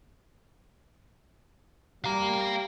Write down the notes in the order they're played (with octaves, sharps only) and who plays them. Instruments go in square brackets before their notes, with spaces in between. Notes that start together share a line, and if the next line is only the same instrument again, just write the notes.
[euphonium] G3 [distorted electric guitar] F5 A#5